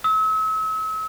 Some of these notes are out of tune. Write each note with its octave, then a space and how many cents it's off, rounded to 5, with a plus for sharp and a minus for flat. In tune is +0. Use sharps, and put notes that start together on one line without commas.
E6 -40